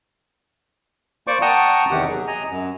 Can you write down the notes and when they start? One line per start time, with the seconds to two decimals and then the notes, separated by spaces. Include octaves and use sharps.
1.27 A#3 C5 D5 C#6 D6
1.42 F#5 G5 A5 A#5 C#6 D#6
1.91 E2 C3 D#3 G4 F#5
2.09 F#3 G#4
2.27 D#5 G#5 A#5
2.50 F#2